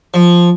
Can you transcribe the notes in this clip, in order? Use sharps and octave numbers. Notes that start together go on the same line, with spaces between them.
F3